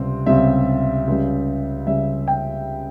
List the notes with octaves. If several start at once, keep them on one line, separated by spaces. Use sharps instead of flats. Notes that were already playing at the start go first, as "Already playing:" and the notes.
Already playing: C#2 C3 G3 C4
C#2 C3 G3 C4 E5
C#2 C#3 G3
C#2 C#3 G3 E5
G5